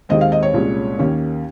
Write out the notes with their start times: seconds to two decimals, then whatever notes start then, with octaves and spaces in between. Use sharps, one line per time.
0.09 D#2 D#3 G#3 C4 D#5
0.21 F5
0.32 D#5
0.43 C#5
0.53 C2 A#2 G#3 C#4
0.99 D#2 D#3 A#3 C#4